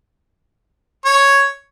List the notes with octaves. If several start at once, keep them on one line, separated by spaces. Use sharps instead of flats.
C#5